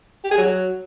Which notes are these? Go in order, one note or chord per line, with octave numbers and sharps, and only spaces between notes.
G4
G#4
F#3